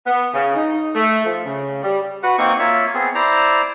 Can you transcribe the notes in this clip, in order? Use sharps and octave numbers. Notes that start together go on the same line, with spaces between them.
B3
C#3
D#4
A3
F3
C#3
G3
F#4 B4 F#5
A#3 C4 D#4 C#6
A#3 F4 C#5 E5
B3 C4 G#4
E4 C5 D5 A#5